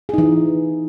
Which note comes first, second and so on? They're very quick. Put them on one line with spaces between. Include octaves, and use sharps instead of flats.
G#4 D#4 E3